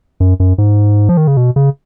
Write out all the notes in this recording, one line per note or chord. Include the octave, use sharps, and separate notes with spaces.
F#2
F#2
G#2
F3
D#3
C#3
B2
C#3